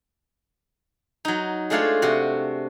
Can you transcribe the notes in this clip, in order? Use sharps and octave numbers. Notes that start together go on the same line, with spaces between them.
F#3 D#4
G#3 A3 D4 F4 C5 C#5
C3 F#4